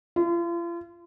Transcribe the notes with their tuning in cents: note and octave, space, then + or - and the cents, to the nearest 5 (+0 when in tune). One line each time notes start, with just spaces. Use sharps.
F4 -40